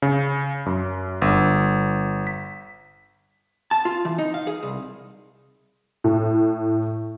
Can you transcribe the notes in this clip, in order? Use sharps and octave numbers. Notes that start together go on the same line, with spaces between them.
C#3
F#2
G1
B6
A5
F4
E3
D#4
F5
G#4
C2
A2